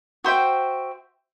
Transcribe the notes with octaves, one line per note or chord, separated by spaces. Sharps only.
F#4 C5 E5 G5